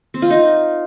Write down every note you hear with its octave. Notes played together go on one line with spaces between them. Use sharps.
C4
F4
D#4